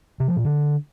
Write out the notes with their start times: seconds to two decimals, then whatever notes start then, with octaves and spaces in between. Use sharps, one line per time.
0.20 C3
0.28 F3
0.36 A#2
0.45 D3